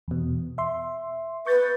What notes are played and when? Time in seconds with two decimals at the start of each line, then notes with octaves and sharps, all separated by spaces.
0.08 E2 B2
0.58 E5 C6
1.46 B4 C#6 G6 A6